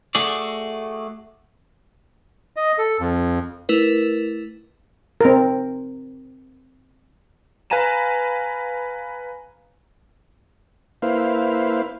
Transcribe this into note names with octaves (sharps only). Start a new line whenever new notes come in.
A3 F#4 G#4 D5
D#5
A4
F2
A3 E4 A#4 B4
C4 A#4
B4 F5 G#5 A#5 D#7 E7
A#3 E4 B4 C5 F5